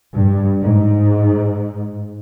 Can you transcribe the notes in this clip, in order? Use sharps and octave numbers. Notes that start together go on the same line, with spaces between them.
G2
G#2